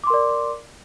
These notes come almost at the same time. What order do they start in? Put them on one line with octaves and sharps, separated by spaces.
D6 C6 A#4 D5